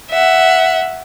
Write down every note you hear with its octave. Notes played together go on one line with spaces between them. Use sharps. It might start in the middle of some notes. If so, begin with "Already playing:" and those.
E5 F#5